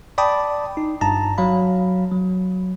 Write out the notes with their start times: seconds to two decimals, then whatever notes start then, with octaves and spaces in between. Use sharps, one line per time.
0.18 D5 G5 A5 B5 D6 D#6
0.77 D#4
1.01 G1 G2 A5 A#5
1.38 F#3 F5 B5
2.11 F#3